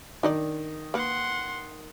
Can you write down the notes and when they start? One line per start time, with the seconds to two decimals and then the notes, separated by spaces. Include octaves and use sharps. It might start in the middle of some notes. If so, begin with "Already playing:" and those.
0.23 D#3 D4 D#4 D5
0.94 A#3 B4 F#5 C6